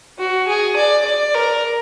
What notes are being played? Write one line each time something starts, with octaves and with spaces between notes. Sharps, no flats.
F#4
G#4
D5
D5
A#4